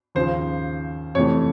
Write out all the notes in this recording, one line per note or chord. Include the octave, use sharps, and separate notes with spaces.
D#2 C#3 F3 C5
F2 C3 E3 A3 C#5